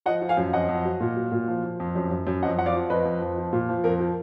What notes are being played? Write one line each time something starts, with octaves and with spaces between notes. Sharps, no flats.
F3 D#5 F#5
F3
F5 G#5
F#2
F2 D#5 F#5
F2
F#3
A#2
F#3
A#2
F3
F3
F2
F#2
F#2
F#2
F2 D#5 F#5
F2 F#5
D5 F5
F3
F2 B4 D#5
F2
F2
F3
A#2
F3
F2 A#4
F3